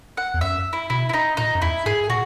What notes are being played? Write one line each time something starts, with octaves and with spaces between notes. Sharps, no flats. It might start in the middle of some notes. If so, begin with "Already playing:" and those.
F#5
E2
F#2 E5
E4
B2 E4
E4
D#4
A#2 D#4
F#2
E2 E4
G#2 G#4
A#2 F#4